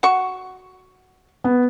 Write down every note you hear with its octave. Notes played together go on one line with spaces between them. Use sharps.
F#4 C#6
B3